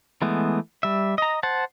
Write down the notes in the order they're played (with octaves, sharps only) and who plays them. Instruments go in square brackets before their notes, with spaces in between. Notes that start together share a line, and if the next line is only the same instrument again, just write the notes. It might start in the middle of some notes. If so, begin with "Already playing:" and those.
[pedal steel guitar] E3 G#3 A3 B3
G3 E5
D#5 A#5
C5 F#5 A5